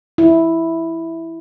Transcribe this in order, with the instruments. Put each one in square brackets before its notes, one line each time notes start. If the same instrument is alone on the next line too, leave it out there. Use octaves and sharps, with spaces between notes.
[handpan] E4